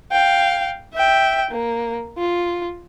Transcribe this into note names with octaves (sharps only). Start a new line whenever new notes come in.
F5 G5
E5 G5
A#3
F4